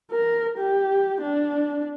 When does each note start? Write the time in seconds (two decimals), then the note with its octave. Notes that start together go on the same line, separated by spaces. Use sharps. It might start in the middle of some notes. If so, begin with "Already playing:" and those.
0.11 A#4
0.59 G4
1.22 D4